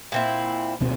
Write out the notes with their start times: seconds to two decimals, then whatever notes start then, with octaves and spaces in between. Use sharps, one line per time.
0.12 A#2 C4 E4
0.80 D1 B2 C4